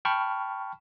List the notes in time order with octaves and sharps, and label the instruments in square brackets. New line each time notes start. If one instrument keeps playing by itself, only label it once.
[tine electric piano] G5 A5 B5 C#6 F6